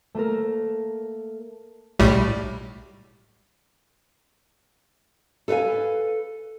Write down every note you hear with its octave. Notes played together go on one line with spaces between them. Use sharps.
A3 A#3 A4 A#4
B1 A2 G3
A4 B4 C#5 F5 G#5